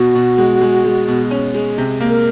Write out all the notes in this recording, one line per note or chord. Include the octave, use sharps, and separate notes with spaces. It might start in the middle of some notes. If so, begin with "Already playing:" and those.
Already playing: B2 F#4
B2
G#3
G#3
G#3
B2
C#4
G#3
C3
A#3
A#4